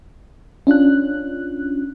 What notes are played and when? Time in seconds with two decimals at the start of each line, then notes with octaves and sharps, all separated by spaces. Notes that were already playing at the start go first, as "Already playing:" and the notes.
0.67 C#4 D4 F4 F#6